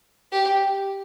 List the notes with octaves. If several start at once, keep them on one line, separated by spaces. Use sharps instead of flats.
G4